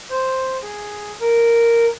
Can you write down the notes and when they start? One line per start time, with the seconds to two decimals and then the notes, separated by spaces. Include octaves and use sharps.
0.10 C5
0.63 G#4
1.20 A#4